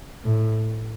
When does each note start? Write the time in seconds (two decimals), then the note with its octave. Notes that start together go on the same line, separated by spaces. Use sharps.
0.25 A2